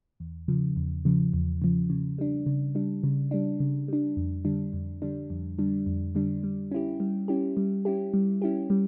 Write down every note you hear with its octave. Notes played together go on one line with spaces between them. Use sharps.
E2
C#3 F3
E2
C#3 F3
E2
C#3 F3
C#3
G3 D4
C#3
G3 D4
C#3
G3 D4
C#3
G3 D4
F2
D3 G3 D4
F2
D3 G3 D4
F2
D3 G3 D4
F2
D3 G3 D4
G3
C#4 E4 G4
G3
C#4 E4 G4
G3
C#4 E4 G4
G3
C#4 E4 G4
G3